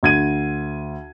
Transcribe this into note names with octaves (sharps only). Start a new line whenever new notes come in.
D2 G#6 D#7